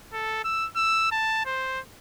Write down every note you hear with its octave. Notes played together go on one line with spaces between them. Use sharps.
A4
E6
E6
A5
C5